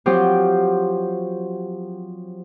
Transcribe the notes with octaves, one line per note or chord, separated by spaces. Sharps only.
F3 F#3 C4 F4 G4